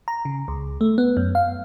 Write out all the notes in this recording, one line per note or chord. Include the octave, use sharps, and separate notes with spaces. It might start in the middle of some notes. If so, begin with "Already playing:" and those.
A#5
C#3
C#2
A3
B3
F#2
F5